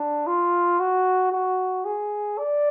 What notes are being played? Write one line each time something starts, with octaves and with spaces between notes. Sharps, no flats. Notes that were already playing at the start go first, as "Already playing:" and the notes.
Already playing: D4
F4
F#4
F#4
G#4
D5